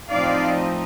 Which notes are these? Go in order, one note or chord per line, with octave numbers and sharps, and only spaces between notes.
A2 F3 C4 D#4 D5 F5